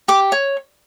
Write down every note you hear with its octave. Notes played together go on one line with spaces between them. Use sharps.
G4 D6
C#5